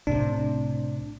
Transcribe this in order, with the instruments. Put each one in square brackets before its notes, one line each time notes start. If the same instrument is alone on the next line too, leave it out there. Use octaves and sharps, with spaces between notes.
[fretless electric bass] C2 A2 C3 [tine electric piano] D4